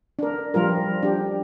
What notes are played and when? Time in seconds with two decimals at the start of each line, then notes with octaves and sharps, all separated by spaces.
0.19 D4 A#4
0.54 F3 G3 F4 A#4
1.03 D4 G4